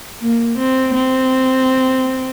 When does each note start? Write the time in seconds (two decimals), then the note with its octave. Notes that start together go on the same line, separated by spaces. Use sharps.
0.21 A#3
0.58 C4
0.94 C4